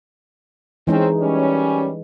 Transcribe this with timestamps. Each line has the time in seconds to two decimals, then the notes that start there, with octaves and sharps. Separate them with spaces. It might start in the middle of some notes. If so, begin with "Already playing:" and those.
0.87 E3 G#3 C4 C#4 D#4
1.19 F#2 G3 C#4